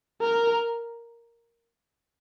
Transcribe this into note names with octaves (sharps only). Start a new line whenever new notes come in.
A#4